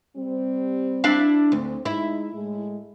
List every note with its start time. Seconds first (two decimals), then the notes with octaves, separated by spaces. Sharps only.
0.17 G3 C4
1.04 D4 E4 F5
1.52 D2 C4
1.85 G#3 D#4 E4
2.33 A2 G#3